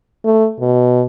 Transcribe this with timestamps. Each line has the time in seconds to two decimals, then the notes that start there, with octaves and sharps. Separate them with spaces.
0.25 A3
0.60 B2